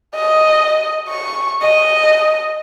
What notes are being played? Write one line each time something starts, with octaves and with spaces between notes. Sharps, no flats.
D#5
C#6
D#5